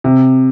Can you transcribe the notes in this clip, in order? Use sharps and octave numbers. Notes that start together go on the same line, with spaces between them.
C3